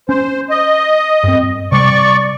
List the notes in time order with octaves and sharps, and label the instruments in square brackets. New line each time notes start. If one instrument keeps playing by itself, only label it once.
[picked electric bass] C#4 [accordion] C5
[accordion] D#5
[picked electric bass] G2 C4
[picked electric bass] C3 G3 [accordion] D5 C#6